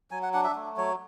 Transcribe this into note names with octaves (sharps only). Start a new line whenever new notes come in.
F#3 G#5
F#5
D4 F#5
E5
A3
F#3 C#5